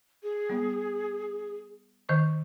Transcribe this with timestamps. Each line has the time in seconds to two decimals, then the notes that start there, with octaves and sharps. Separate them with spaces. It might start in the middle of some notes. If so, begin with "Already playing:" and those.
0.23 G#4
0.49 G3 B3
2.09 D#3 C5 C#6